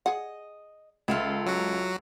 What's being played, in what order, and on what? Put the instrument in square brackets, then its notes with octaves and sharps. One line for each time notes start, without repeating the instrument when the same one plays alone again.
[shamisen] G#4 F#5 [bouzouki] D#5
[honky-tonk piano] C#2 [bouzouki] F4 A4 E5
[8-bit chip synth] F#3 F#4